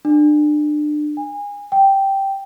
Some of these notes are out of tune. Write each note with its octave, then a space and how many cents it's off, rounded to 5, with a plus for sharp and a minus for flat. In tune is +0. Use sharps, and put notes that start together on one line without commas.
D4 +30
G#5 -25
G5 -5